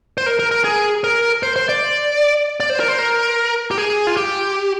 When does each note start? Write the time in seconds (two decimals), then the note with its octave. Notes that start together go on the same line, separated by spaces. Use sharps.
0.18 C5
0.26 A#4
0.39 A#4
0.51 A#4
0.64 G#4
1.04 A#4
1.43 C5
1.56 C5
1.69 D5
2.60 D5
2.70 C5
2.80 A#4
2.88 C5
2.99 A#4
3.71 G4
3.78 G#4
4.07 F4
4.17 G4